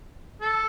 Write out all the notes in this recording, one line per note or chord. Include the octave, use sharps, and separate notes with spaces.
A4